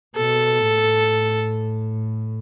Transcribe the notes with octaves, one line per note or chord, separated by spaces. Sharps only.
B2 A4
A2